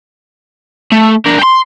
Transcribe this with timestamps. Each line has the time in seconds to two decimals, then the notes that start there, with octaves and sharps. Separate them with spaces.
0.92 A3
1.26 D4 A#4
1.39 G5 C6